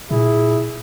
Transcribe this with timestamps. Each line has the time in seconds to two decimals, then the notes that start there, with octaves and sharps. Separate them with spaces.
0.11 A#2 E4 G#4